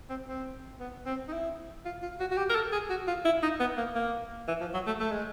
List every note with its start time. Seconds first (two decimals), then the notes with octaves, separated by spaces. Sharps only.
0.10 C4
0.28 C4
0.80 B3
1.06 C4
1.28 D#4
1.33 E4
1.85 F4
2.02 F4
2.20 F#4
2.31 F#4
2.38 G4
2.50 A#4
2.55 A4
2.72 G#4
2.90 F#4
3.08 F4
3.25 E4
3.43 D#4
3.60 B3
3.78 A#3
3.95 A#3
4.48 E3
4.61 F3
4.74 F#3
4.87 A3
5.00 A3
5.11 G#3